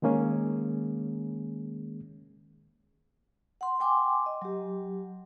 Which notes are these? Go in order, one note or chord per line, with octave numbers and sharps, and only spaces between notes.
D#3 G#3 A#3 C#4 G#4
F#5 C6
G5 G#5 C6 D6
D#5
F#3 G4